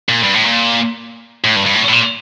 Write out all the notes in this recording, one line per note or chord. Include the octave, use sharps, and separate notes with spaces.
A#2
G2
A2
A#2
A2
G2
G2
A2
A2
A#2